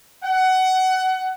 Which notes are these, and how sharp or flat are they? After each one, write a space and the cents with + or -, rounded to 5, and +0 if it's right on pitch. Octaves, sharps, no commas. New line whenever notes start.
F#5 +20